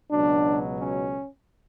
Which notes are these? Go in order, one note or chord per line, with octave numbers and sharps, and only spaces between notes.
C#2 B2 F#3 D4
C#4